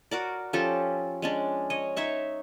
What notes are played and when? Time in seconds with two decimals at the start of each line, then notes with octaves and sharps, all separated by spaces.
0.11 F#4 A#4 D5
0.53 F3 C#4 G4 A4
1.22 G#3 C#4 D4
1.70 C#5 D#5
1.96 D#4 C#5 E5 C#6